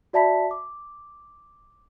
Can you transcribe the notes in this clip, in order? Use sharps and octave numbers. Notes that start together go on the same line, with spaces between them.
F#4 D5 E5 A5 B5 B6
D6